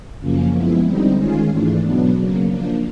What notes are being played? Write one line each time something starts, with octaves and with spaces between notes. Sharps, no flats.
F#2 C#3 F3 A#3 C#4
F3 G#3 B3 E4
D3 G3 C4 D#4
D#3 G#3 C#4 F4 G#4
G#2 E3 A3 D4
B2 F#3 B3 D4
C#3 F#3 A#3
F3 A#3 D4